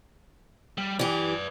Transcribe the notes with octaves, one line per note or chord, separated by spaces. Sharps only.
G3
E3 G4 B4 D5